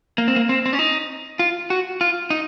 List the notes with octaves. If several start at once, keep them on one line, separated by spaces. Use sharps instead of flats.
A#3
C4
A#3
C4
C4
C#4
D#4
F4
F#4
F4
D#4